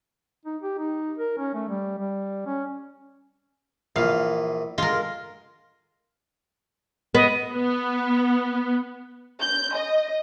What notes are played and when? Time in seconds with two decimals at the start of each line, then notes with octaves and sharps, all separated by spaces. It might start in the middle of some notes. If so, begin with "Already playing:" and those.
0.45 D#4
0.62 G4
0.78 D#4
1.18 A#4
1.37 C#4
1.54 A3
1.69 G3
1.99 G3
2.46 C#4
3.96 A#1 E3 F5
4.78 G#3 F4 A#4
7.15 B3 D#5
7.52 B3
9.41 G6
9.76 D#5